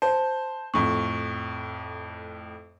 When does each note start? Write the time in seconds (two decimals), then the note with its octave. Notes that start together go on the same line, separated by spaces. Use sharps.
0.02 C5 A5
0.74 F2 A2 C#6